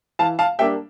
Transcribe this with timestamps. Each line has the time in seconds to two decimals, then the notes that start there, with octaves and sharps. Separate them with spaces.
0.19 E3 F5 A5
0.39 F5 A5
0.59 G3 A#3 D4 E5 G5